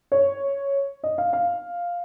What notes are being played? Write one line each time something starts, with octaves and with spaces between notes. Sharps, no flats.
C#5
D#5
F5
F5